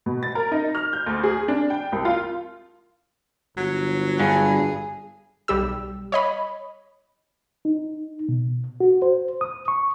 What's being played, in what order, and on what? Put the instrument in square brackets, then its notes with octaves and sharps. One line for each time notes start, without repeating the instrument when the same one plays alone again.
[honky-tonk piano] B2
A6
A#4
D#4
F6
G6
D2
G#4
D4
G5
C2
F4
[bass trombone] G1 [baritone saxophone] F#3
[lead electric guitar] G2 [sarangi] G#4
[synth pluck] B1 G3 G4 E6
C#5 D#5 B5
[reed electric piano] D#4
B2
F#4
C5
D#6
C#6